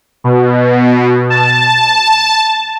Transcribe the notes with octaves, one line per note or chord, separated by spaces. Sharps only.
B2
A5